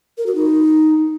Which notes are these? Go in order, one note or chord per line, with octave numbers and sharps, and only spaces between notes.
A#4
F#4
D#4